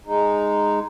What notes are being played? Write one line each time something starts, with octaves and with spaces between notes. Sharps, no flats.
G#3 D#4